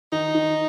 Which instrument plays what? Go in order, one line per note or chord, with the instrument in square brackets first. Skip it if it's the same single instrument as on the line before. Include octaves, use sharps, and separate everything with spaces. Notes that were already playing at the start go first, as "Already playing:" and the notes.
[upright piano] D#3 [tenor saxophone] D#4
[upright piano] D#3